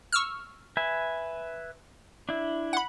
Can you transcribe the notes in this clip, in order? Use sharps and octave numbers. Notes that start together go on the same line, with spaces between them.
C#6 E6 F6
B4 E5 G#5
D4 E4
F#5 B5